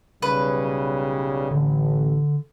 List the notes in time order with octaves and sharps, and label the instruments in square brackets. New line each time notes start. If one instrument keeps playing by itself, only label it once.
[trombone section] B1 C#3 G3 [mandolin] B4
[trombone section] A1 [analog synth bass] D3